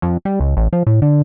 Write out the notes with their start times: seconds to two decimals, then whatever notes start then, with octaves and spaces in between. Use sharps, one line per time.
0.02 F2
0.25 G3
0.40 C#2
0.57 A1
0.73 F3
0.87 A2
1.02 D3